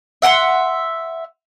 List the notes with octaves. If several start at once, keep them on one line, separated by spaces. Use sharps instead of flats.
E5 F#5 G5 C6